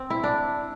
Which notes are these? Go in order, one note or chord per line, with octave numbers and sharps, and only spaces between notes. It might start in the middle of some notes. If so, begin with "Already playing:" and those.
Already playing: C4
E4
D4